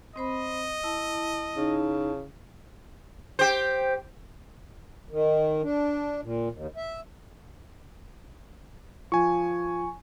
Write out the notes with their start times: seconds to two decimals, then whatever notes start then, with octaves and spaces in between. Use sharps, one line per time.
0.16 C4 C5 D#5 B5
0.84 E4 A5
1.57 C#3 D#4
3.39 G4 C5
5.11 D#3
5.62 D4
6.22 A#2
6.50 D#2
6.76 E5
9.12 F3 G#5 C#6